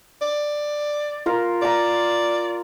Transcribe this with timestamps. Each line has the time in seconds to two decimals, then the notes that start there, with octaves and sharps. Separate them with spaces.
0.22 D5
1.26 F4 A#4
1.62 D5 F5 A#5